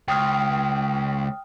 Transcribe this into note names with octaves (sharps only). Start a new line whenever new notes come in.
C#2 G5 D#6 F6